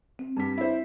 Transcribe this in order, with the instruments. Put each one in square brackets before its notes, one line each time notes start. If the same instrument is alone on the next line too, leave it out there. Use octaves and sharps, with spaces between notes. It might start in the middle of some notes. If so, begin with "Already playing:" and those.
[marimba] C4
[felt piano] G2 B6
E4 C5